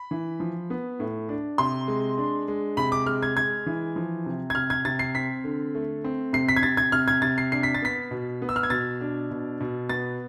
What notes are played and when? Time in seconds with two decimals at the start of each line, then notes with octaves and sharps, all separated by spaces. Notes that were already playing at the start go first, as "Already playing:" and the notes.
Already playing: B5
0.11 E3
0.40 F3
0.70 B3
1.00 A2
1.29 D4
1.58 C3 C6
1.88 G#3
2.18 D4
2.48 G#3
2.77 C3 B5
2.92 D6
3.06 G#3 F6
3.23 G#6
3.36 G#3 G#6
3.66 E3
3.96 F3
4.26 C3
4.50 G#6
4.55 C3 F6
4.70 G#6
4.85 C3 A6
4.99 C7
5.15 C4 B6
5.44 D3
5.75 A3
6.04 C4
6.33 C3 C7
6.49 B6
6.56 G#6
6.63 C3 A6
6.77 G#6
6.92 C3 F6
7.08 G#6
7.22 C3 A6
7.38 C7
7.52 D4 C7
7.63 B6
7.75 A6
7.82 B3 B6
8.11 B2
8.42 B3
8.49 E6
8.56 F6
8.63 G#6
8.70 B2 A6
9.01 D4
9.31 B2
9.60 B2
9.89 B3 A6